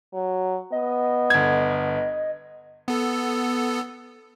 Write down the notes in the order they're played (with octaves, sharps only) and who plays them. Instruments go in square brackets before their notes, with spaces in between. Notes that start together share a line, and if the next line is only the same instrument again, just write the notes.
[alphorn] F#3
[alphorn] B3 [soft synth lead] D#5
[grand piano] G1 G#6
[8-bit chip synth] B3 A4